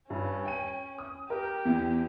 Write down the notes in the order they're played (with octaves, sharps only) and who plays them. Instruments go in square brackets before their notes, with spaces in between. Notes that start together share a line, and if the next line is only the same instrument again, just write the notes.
[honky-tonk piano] G2 [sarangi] C#4
[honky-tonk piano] G5 D#7
D#6
[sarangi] G4 [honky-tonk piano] A#4
[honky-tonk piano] E2